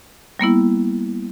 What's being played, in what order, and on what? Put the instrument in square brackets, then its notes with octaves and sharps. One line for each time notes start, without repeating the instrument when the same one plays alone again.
[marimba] G3 A#3 B3 E4